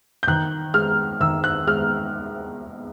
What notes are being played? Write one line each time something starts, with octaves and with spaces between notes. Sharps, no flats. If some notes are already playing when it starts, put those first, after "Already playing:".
G6
D#3 F#6
G#3 F6
D#3 E6
F#6
G#3 F6